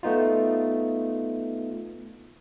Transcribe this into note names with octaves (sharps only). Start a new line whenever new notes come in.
A3 B3 D#4 F4